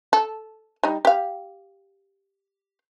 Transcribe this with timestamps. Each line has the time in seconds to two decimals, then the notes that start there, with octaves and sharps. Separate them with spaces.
0.13 A4
0.83 G3 D#4
1.05 G4 F5